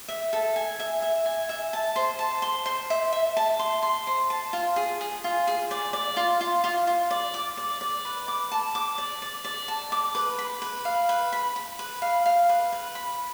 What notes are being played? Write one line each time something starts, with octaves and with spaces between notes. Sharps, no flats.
E5
A4
G#5
E5
E5
G#5
E5
A5
C5
A5
C6
C5
E5
E5
A5
C6
C6
C5
A5
F4
G#4
G#4
F4
G#4
D5
D5
F4
F4
F4
F4
D5
D6
D5
D5
B4
D6
A5
D6
D5
D5
D5
A5
D6
B4
B5
B4
F5
B4
B5
B5
B4
F5
F5
B4
B4
B5